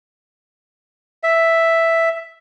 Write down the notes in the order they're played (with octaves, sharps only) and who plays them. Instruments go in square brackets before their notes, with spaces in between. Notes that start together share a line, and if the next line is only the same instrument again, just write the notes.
[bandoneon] E5